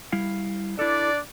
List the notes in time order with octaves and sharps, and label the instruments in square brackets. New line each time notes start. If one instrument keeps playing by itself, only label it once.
[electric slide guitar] G3 E4 F5
[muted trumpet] D4 [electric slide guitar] E4 A4 [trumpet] D5